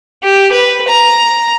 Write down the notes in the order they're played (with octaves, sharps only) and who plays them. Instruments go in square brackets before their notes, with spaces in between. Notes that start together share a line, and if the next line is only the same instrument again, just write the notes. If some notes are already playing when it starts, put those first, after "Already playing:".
[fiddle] G4
B4
A#5